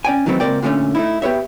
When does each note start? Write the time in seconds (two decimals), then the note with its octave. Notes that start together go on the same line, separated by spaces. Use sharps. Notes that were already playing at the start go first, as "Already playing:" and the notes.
0.05 C#4 D5 G5 G#5
0.26 D#3 E3 F#3 A3 C4 E4
0.40 C#2 A#2 C4 A#4 D5 G5
0.62 A#2 D3 G3 A3 C#4
0.95 A3 D#4 E4
1.22 B3 G4 B4 C#5 E5